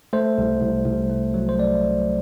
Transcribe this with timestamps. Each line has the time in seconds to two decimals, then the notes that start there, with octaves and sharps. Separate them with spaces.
0.13 A3 C5
0.38 C2
0.61 C2
0.86 C2
1.10 A3
1.34 F#3
1.49 C5
1.58 A3 D5
1.83 F#3